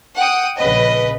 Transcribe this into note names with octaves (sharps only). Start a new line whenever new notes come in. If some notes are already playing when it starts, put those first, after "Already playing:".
F#5 G5 D#6
A#1 C#3 B4 D#5